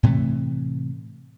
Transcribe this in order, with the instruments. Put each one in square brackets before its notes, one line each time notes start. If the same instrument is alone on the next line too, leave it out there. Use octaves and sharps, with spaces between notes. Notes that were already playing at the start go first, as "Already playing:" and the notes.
[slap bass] A2 C3 E3 A3